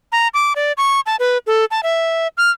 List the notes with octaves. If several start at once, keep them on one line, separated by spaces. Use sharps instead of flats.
A#5
D6
D5
C#6
A5
B4
A4
A5
E5
F6